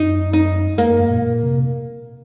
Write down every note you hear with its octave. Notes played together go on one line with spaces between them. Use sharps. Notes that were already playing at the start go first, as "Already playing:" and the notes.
Already playing: F#2 D#4
D#4
F2 A#3
F#2
F#2
A#2
A#2
C3